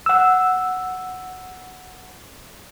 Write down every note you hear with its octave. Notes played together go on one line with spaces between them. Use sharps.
F#5 E6